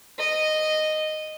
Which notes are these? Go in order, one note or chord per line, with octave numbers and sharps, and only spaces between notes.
D#5